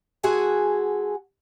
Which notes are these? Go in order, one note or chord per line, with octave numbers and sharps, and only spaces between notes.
G#3 F#4 G#4 A4 F#5 G#5